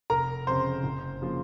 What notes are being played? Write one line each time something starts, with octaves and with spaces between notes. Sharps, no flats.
F1 A#4 A#5
F2 C#3 C5 C6
F#1
C#3 F3 A#3